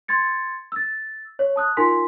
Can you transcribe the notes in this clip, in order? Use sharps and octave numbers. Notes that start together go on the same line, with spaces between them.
C6 G#6 A6 C#7
E6 A6
C#5
A5 D#6 F#6
D#4 F4 A#4 G#5 C6 B6